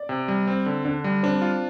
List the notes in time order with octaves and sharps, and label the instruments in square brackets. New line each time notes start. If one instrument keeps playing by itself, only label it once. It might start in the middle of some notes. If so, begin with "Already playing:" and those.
Already playing: [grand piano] D5
[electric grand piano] C3
G3
C4
D3
[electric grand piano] D3 [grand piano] D4
[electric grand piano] G3
[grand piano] C4 [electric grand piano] D4
[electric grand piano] F4